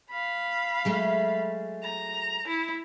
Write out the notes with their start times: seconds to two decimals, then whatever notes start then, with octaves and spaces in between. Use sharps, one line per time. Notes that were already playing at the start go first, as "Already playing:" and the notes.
0.11 F5 B5
0.85 F#3 G#3 A3
1.83 A#5
2.48 E4